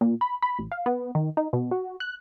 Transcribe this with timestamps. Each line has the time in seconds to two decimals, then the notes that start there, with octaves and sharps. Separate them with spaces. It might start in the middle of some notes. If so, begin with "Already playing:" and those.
0.01 A#2
0.21 B5
0.42 B5
0.59 A1
0.72 F5
0.86 B3
1.15 D#3
1.37 D#4
1.53 B2
1.71 F#4
2.00 F#6